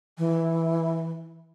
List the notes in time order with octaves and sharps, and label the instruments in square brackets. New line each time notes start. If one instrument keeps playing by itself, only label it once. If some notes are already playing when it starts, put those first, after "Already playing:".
[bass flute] E3